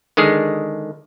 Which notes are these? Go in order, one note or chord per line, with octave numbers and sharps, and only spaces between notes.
D3 D#3 G#3 G#4